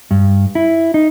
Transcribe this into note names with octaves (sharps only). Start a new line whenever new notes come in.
G2
E4
D#4